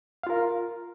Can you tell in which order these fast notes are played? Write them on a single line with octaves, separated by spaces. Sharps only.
F5 F4 A#4